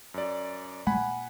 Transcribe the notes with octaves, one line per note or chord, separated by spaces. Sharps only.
F#2 D5
A#2 F#5 G#5 B5